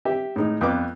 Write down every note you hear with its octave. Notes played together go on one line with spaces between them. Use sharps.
G4 E5
A2 G#3 D#4
F2 B3 D6